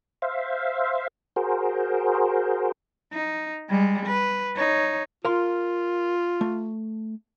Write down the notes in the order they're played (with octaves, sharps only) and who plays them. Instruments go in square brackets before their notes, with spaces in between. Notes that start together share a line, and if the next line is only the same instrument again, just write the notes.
[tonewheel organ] C5 E5 F5
F#4 G#4 A#4 C5
[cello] D#4
G3 G#3
B4
D#4 C#5
[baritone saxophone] F4 [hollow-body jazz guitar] A#4 F5 C6
[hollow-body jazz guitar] A3